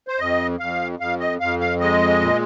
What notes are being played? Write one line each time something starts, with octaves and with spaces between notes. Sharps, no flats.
C5
F2 D#5
F2 F5
F2 F5
D#5
F2 F5
F5
G#3 D#5
A#2